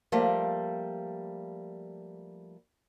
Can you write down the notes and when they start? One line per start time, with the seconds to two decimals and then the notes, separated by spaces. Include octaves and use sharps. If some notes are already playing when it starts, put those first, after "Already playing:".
0.12 F3 G3 A3 A#3